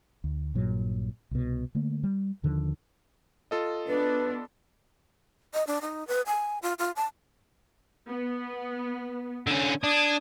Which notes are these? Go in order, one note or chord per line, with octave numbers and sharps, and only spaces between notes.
D2
A#1 G2 A#2 F#3
C2 B2
D3 A3 A#3
G3
D#2 D3 D#3 F3
F4 A4 D#5
B3 D4 B4
D#5
D4
D#4
B4
G#5
F4
F4
A5
B3
D3 C#4
D4 D#6 G#6